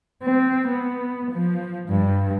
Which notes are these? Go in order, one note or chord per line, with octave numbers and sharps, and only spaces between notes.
C4
B3
F3
G2